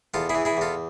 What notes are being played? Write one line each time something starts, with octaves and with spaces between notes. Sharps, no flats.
E2 F4 A4
E4 G#4
E3
E4 G#4
E2 F4 A4